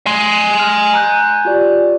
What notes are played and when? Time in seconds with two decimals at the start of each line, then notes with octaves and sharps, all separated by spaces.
0.07 G#5 C6
0.59 F6
0.93 A#5 F#6 G6
1.45 F4 G4 D5